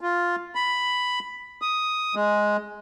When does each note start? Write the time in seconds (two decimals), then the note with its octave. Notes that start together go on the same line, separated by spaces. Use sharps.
0.01 F4
0.55 B5
1.62 D#6
2.15 G#3